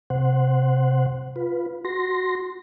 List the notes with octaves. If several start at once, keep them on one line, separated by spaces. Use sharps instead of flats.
C3 C5 F#5
F4 B4
F#4 C6 A#6